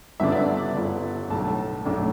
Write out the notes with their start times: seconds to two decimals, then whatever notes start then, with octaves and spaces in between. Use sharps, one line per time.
0.20 G1 G2 D3 B3 D4 E5
0.32 D5
0.38 E5
0.75 G1 G2 D3 B3 D4
1.30 B1 A2 A3 D4 A5
1.85 B1 A2 A3 D4